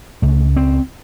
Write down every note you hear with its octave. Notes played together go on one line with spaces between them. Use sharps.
C#2 C#3 A3
C4